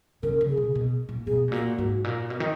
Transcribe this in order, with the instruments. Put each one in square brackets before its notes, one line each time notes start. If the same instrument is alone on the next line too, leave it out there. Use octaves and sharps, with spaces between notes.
[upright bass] C#3 [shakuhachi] A#4
[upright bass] C#3
[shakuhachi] G#4
[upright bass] B2
B2
A#2
[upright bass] B2 [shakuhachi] G#4
[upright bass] G#2
[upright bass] A#2 [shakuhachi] F#4
[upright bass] G#2
A#2
B2
D#3